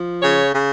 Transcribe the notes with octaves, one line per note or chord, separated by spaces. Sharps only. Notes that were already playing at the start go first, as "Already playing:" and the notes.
Already playing: F3
C#3 C#5
C#3